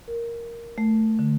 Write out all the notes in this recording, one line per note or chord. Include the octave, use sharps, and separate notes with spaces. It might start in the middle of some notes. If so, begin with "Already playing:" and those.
A#4
A3
D3